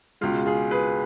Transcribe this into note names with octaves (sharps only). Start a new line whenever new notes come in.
C#2 B2 G#3 F4
F4 G#4
G#4 B4